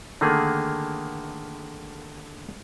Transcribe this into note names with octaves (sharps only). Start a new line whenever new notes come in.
D3 D#3 A3 A#3 G#4